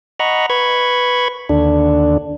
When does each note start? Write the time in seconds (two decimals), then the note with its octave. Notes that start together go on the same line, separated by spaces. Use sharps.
0.20 D#5 F#5 A#5 B5 C#6
0.50 B4 B5 C#6 G#6
1.49 D#2 D3 D4